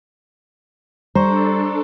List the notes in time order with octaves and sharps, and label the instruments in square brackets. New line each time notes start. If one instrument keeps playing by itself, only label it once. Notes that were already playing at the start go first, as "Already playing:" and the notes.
[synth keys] G3 [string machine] D4 A4 [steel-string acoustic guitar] C5 [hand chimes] A#5 C#6